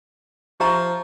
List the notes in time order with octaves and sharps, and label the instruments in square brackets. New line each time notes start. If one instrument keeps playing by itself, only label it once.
[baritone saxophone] F3 [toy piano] G4 E5 A#5